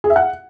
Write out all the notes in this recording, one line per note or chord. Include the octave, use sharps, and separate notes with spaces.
G#4
E5
F#5